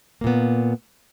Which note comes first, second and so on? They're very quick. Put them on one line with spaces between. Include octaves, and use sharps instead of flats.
A#3 A#2 B3